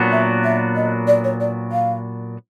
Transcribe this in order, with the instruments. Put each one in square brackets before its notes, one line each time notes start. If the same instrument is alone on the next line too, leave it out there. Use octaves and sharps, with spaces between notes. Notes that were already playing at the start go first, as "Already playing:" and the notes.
Already playing: [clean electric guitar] A#2 F#3 B3 D4 F#4
[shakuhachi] E5
E5
D#5
D5
C#5
D5
F5